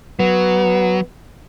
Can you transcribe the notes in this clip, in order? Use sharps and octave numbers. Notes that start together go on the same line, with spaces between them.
F#3 B3